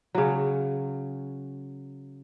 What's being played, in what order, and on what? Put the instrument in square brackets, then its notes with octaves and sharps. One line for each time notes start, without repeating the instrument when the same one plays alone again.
[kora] C#3 F#3